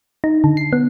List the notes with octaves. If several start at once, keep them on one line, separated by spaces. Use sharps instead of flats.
D#4
D3
C7
B3